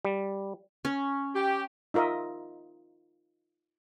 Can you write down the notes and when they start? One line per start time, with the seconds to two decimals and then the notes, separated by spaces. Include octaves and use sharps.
0.05 G3
0.85 C#4
1.35 G4
1.94 D#4 F4 A#4 D#5 E5